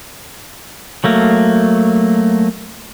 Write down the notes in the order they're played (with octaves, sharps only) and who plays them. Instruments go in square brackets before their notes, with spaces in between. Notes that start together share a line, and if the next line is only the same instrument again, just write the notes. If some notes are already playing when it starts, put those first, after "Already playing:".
[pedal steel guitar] F#3 A3 A#3